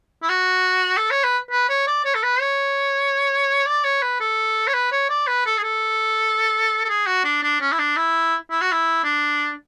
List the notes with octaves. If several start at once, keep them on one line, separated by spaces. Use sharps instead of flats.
E4
F#4
A4
C#5
B4
B4
C#5
D5
C#5
A4
B4
C#5
D5
C#5
B4
A4
C#5
B4
C#5
D5
B4
A4
G#4
A4
A4
G#4
F#4
D4
D4
C#4
E4
D4
E4
E4
F#4
E4
D4